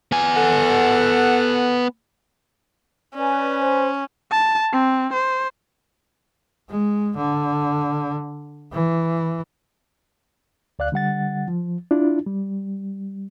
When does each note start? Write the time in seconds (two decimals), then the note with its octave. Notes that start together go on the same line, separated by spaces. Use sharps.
0.12 B3 G#5
0.37 A4 F#5
3.15 C#4 B4 D5 G#5
3.60 C5
4.31 A5
4.73 C4
5.13 C5
6.69 G#3
7.16 D3
8.72 E3
10.79 D2 D5 F5 F#6
10.92 D3 G3 F#5 A6
11.48 F3
11.91 D4 E4 F4
12.26 G3